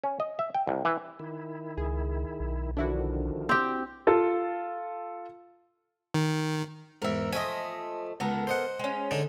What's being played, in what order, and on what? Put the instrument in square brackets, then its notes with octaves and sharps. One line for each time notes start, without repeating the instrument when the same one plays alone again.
[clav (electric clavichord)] C#4
D#5
E5
G5
C2
E3
[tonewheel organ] D#3 E4
[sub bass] C#2 [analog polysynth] G#4
[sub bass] B1
[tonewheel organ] D3 D#3 F3 [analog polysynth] D4 E4 F#4
[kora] C4 G4
[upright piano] F4 A4
[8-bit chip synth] D#3
[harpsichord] E2 G#2 [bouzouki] A#4 E5
[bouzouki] F3 A3 D#5 [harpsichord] E5 G#5
[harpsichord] C#2 [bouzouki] B3 A4 A#4
[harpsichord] C5 D#5 F#5
[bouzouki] G#3 C#4
[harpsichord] D3 D4 D#4